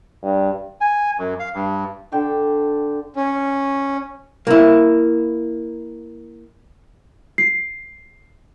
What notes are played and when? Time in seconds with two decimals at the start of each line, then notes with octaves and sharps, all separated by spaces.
0.23 G2
0.81 G#5
1.19 F#2
1.40 F5
1.54 G2
2.12 D3 G5 A5 C#6
3.16 C#4
4.47 A#3 E4
7.38 C7